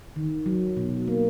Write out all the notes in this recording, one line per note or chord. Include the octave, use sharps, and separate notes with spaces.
D#3
F#3
B2
A#3